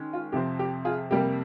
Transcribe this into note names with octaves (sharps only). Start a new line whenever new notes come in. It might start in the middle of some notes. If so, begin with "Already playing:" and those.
Already playing: D#3 G#3 C#4
F4
F2 C3 F3 C4 G4
G4
F4 G#4
F2 C3 G3 A#3 G4